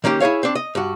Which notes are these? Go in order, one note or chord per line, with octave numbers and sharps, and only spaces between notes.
D#3 A#3 C#4 G4
E4 G#4 A#4 C#5 F5
C4 D4
D#5
G2 F#4